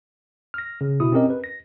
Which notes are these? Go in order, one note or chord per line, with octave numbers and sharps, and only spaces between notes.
F6 A#6
C#3
B2 E4 D#6
C4 C#4 G4 A#4 D#5
B4
A#6